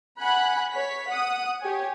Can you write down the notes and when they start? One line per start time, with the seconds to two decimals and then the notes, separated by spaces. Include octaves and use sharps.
0.21 F#5 G#5 B5 F#6
0.72 C#5 B6
1.09 F#5 D#6
1.61 G4 C#5 G#5